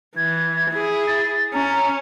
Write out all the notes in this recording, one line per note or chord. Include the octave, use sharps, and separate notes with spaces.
E3 G#6
E4 G#4
A6
C#4 A#5